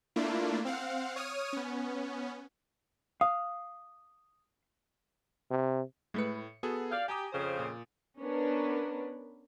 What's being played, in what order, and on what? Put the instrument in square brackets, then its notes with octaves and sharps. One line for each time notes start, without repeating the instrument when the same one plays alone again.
[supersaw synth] A3 A#3 D4 E4 F4
C4 F5 F#5
C#5 D#6 F6 D#7
B3 C#4
[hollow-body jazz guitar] F5 [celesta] D#6
[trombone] C3
[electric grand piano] A2 C#7 [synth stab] G#3 A3 B4
[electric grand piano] B3 G#4 A4 [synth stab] F#4
[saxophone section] D5 F5 [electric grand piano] G6
[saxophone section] G4 [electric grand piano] G#5 A#5 D#6
[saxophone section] F2 C#3 C5
[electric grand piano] A#2
[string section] B3 C#4 D4 A#4 B4